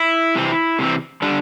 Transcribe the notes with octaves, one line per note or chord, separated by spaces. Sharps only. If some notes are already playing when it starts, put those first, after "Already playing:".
Already playing: E4
C3 E3 C4
C3 E3 C4
D3 G3 D4